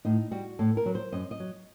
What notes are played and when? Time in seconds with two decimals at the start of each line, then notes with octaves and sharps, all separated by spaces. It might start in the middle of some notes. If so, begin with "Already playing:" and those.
0.05 A2 D#4
0.31 G3 F#4
0.59 A2 A4
0.77 A#4
0.86 F#3
0.95 C5
1.12 F#2 D#5
1.31 D#5
1.40 F#3